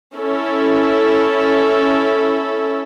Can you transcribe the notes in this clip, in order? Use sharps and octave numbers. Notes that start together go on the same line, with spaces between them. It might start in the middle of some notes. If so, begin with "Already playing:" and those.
C#4 E4 A4